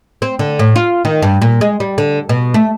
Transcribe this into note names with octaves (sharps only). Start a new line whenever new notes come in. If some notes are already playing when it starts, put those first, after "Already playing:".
C4
D3
A2
F4
D#3
G2
A#2
G#3
G3
D3
B2
A3